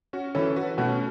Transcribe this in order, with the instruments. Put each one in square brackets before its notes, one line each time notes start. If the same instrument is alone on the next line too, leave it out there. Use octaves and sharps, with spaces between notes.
[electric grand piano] C#4 F#4
[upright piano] E3 C#4 [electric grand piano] E4 A4
[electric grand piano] F#4 B4
[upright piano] B2 [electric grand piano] A3 C#4